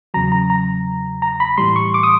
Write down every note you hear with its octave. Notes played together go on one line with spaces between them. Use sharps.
E2 C#3 F#3 A#5
A#5
A#5
A#5
B5
A2 E3 G3 C6
C#6
D6
D#6